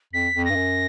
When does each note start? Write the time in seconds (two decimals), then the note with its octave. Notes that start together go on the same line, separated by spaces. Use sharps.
0.13 F2 B6
0.35 F2
0.45 G2 A#6
0.56 F#2